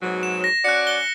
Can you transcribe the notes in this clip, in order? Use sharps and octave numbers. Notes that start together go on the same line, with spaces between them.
G#2 B2 F#3
E7
A#6
C#4 F#4 D5 F#6 C#7
G7